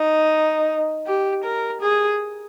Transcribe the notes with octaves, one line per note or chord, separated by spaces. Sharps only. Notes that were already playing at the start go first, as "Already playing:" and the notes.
Already playing: D#4
G4
A#4
G#4